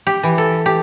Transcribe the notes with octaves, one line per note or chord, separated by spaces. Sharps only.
G4
E3
A4
G4